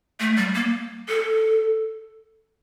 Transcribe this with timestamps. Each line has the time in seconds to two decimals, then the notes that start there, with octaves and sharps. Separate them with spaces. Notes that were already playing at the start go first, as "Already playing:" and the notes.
0.20 A3
0.37 G3
0.55 A#3
1.08 A4